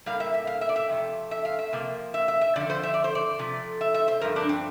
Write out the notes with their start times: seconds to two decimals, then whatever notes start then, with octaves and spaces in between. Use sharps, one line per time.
0.06 A2 G3 A#3 F5
0.20 E5
0.34 E5
0.47 F5
0.61 E5
0.69 D5
0.76 E5
0.90 F2 C3 A3
1.31 E5
1.45 F5
1.59 E5
1.72 C3 F3 A#3
2.14 E5
2.28 E5
2.41 E5
2.56 F2 D3 F3 D5
2.70 C5
2.83 E5
2.94 D5
3.04 C5
3.15 D5
3.39 C3 F3 A3
3.81 E5
3.94 E5
4.08 C5
4.21 G2 F3 A3 A#4
4.36 D4
4.49 C4